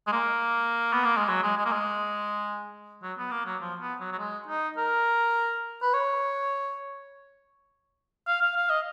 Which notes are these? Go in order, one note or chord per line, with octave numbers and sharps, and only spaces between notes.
G#3
A#3
B3
A#3
G#3
F#3
G#3
G#3
A#3
G#3
F#3
B3
A#3
F#3
F3
B3
F#3
F#3
G#3
D#4
A#4
B4
C#5
F5
F5
F5
D#5